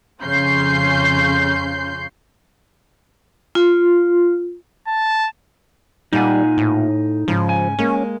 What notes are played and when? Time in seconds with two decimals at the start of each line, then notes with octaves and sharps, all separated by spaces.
0.24 F2 C#3 C#4 C6 G6 C7
3.55 F4
4.87 A5
6.13 A#2 G3 D#4 F4 F#5 G#5
6.58 A2
7.28 G#2 C#3 F3
7.49 G#5
7.79 G#3 A#3 C#4